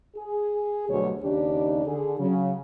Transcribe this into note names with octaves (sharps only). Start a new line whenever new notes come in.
G#4
D2 B2 F#3 G3 C#5
D#2 C#3 D4 D#4 G4
D3 G#4
C#3 F#3